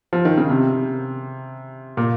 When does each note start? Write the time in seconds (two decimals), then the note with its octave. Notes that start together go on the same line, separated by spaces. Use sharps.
0.13 F3
0.25 D#3
0.38 C#3
0.49 C3
1.97 A#2